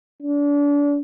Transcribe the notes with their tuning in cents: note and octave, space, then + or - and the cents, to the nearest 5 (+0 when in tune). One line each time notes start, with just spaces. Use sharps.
D4 -30